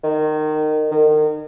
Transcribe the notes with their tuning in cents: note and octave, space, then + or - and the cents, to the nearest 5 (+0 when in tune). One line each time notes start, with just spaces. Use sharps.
D#3 -20
D#3 -35